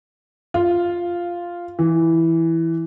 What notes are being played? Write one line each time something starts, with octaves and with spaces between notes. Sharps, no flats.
F4
E3